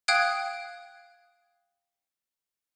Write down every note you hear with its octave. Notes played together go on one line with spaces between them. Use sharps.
F5 G5 D#6 F#6 G#6 D7